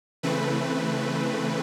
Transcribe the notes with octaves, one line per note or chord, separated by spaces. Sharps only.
C#3 E3 A3 C4 B4